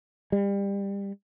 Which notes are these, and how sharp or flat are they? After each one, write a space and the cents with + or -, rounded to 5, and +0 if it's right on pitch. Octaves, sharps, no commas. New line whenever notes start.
G3 +25